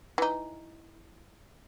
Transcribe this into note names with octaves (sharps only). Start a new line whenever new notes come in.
E3 D#4